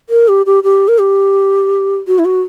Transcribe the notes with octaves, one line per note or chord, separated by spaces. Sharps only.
A#4
G4
G4
G4
A#4
G4
F#4
E4
F#4